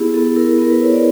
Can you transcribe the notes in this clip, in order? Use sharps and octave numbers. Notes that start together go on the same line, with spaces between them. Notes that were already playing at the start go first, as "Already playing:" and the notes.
Already playing: B3 E4 G4 G#4
B3 A4
E4 A#4
B3 A#4
B4
E4 C#5
D5